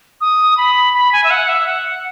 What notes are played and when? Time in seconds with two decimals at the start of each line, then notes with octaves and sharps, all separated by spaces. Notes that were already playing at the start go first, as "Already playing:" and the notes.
0.21 D#6
0.57 B5
0.94 B5
1.13 G#5
1.24 E5
1.30 F#5
1.49 E5
1.67 F#5